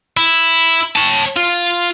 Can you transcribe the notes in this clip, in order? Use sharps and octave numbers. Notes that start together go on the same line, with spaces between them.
E4
C#5 A5
F4